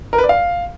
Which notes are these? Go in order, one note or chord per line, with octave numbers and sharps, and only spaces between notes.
A#4
B4
D5
F5